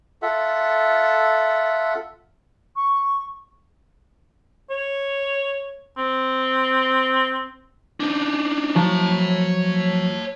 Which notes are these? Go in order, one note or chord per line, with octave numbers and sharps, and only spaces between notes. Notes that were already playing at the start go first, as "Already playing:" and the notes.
F4 A4 E5 F#5
C#6
C#5
C4
D4 D#4
F3 F#3 C#5 A5